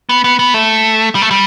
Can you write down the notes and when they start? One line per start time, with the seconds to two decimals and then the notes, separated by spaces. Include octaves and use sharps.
0.09 B3
0.24 B3
0.39 B3
0.54 A3
1.15 G3
1.22 A3
1.31 G3